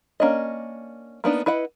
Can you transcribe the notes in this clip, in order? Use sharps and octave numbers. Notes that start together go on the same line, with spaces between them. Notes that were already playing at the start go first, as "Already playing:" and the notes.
A#3 C#4 D4 D#5
A#3 B3 D4 D#4
E4 B4 D#5 F#5